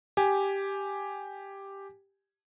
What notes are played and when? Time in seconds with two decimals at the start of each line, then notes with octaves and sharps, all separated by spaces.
0.17 G4 G#5